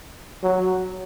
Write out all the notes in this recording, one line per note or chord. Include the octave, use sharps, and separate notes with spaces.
F#3